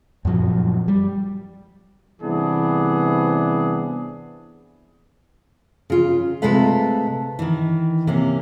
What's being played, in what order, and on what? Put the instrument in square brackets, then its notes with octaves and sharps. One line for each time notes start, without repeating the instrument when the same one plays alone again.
[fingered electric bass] F#2 A#2 F3 F#3
G3
[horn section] C3 E3 G3 B3 D4 G#4
[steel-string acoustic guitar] C#3 F4
C3 G#3 A3 A4 B4 F5
D#3 E3
C3 A#3 C#4